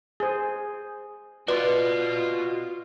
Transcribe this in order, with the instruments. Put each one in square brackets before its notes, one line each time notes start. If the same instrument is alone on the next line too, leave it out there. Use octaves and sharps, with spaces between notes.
[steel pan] G#4 C5
[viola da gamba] F4 [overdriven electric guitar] F#4 D#5 [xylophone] B4 [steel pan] D5 C6